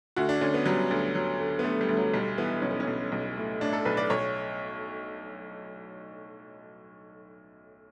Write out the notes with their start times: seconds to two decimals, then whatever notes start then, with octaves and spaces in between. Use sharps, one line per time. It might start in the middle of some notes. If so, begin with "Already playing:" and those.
0.16 D2 F#4
0.29 D4
0.41 D2 C#4
0.54 B3
0.66 F#3 G3
0.91 D2
1.15 F#3
1.40 D3
1.59 B3
1.64 D2 A3
1.81 G3
1.89 D2
1.97 F#3
2.14 B1 G3
2.38 E3 B3
2.62 B1 C#4
2.71 B3
2.80 C#4
2.87 B1
3.12 B1
3.37 A2
3.61 A2 D4
3.73 A4
3.85 B1 B4
3.97 D5
4.10 B1 C#5